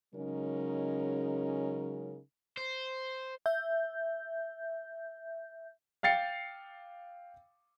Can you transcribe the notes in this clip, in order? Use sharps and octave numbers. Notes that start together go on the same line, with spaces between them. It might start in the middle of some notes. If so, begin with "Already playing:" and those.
C#3 F#3 G#3 C#4 D#4 A#4
C5
E5 G6
F5 G5 A6 C7 C#7